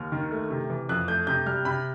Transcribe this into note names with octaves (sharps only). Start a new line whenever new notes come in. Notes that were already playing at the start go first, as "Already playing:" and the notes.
Already playing: D#2 F6
D#3
A3
C3
E3
F2 F#6
A3 G6
C3 G6
G3 F6
C3 B5